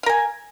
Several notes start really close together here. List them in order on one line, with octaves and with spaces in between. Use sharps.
F5 A#4 G#5